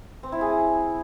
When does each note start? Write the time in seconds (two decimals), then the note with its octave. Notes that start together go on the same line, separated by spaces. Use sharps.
0.23 C4
0.32 E4
0.41 G#4